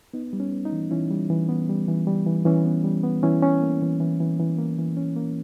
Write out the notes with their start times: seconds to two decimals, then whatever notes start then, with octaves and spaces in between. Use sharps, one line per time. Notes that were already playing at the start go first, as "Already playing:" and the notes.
0.14 B3 D#4
0.33 G3
0.40 C#4
0.52 B3
0.65 D#4
0.72 E3
0.91 E3 C#4 E4
1.11 G3
1.30 E3
1.49 B3
1.69 G3
1.88 E3
2.07 G3
2.26 E3
2.45 E3 C#4
2.65 B3
2.84 G3
3.04 B3
3.23 E3 C#4 E4
3.43 C#4
3.62 A#3
3.82 E3
4.00 E3
4.20 E3
4.39 E3
4.58 A#3
4.78 E3
4.97 C#4
5.16 A#3